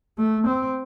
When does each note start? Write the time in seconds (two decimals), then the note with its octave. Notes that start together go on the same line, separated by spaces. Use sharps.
0.18 A3
0.47 C4